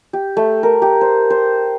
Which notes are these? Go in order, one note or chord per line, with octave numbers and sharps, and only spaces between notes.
G4
A3
A#4
G4
C5
C5